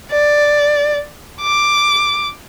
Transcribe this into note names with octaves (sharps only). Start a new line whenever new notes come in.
D5
D6